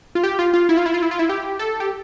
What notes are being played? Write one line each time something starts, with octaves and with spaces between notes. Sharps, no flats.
F4
G4
F4
F4
E4
F4
E4
F4
E4
F4
E4
G4
A4
G4